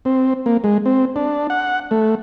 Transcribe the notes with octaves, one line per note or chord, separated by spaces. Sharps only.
C4
A#3
G#3
C4
D4
F#5
A3